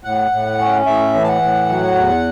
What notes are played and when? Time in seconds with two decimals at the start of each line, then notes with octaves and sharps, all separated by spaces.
0.04 A2 F#5
0.31 A2
0.59 C#4
0.86 A2 E5
1.14 E3
1.23 A5
1.28 F#5
1.42 A2
1.69 F#3
1.96 E2